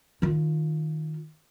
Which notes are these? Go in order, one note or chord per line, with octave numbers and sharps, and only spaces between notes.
D#3 F4